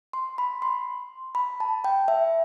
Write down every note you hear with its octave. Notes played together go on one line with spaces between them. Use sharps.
C6
B5
C6
B5
A5
G5
E5